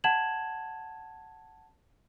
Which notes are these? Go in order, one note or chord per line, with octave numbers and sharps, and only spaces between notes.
F#5 A5 G#6 E7 F#7